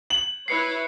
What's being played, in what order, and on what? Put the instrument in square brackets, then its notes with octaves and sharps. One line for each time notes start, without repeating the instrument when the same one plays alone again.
[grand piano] F#7
[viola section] E4 B4 C#5 [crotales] C7 C#7